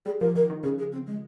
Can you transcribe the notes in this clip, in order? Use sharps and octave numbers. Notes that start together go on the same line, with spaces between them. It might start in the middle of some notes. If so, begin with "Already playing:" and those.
G3 G#4
F3 A#4
D#3 A#4
D#3
C#3 G#4
G#4
C4
G#3